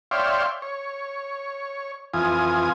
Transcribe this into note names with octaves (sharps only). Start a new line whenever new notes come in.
C#5 D5 E5 F5 G5 C6
C#5
F2 E3 F4 G#5 D#6